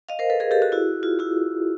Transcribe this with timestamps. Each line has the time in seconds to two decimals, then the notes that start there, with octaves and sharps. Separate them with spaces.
0.09 D#5 F5
0.19 A#4 C5
0.30 A4 B4
0.40 G#4 A#4
0.51 G4 A4
0.62 F#4 G#4
0.72 E4 F#4
1.03 F4
1.19 E4 F#4